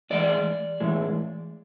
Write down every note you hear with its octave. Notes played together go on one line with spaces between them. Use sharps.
A2 E3 G#3 D5
A2 E3 G#3